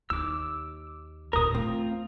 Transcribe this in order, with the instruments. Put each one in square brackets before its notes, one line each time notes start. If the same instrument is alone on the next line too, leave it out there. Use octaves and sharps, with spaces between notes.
[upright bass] D#2 [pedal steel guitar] D6 E6
[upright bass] D#2 A#2 [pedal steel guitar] A#4 D#6
[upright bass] A3 [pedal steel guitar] C4 F4